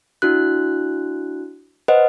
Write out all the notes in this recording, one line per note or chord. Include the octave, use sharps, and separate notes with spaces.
D4 E4 F#4 F#6
B4 C5 D#5 F#5